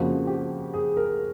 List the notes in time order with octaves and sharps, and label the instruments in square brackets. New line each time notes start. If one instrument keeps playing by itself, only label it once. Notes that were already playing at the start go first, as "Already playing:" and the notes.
Already playing: [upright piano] F2 C#3 F3 A#3 [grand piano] F#4
[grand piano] G4
G#4
A#4